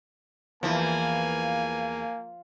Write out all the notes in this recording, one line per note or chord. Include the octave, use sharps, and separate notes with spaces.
E2 E3 F3 A#3 G#5